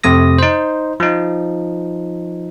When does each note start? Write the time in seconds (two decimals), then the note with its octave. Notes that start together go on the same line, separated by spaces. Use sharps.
0.04 F2 C3 A3 D#6 A#6
0.38 D#4 C5
1.00 F3 D#4